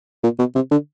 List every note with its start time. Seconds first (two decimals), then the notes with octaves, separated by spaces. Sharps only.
0.23 A#2
0.39 B2
0.55 C3
0.71 D3